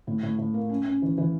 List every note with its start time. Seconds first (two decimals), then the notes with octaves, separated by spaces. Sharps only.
0.07 A2
0.23 A2
0.38 A2
0.54 A#3
0.69 C#4
0.85 C#4
1.02 E3
1.18 E3